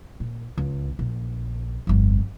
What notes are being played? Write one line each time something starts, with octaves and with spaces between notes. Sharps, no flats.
A#2
C#2
A#1
G1 F2